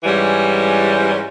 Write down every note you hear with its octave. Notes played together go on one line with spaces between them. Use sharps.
G#2 E3 G3 C#4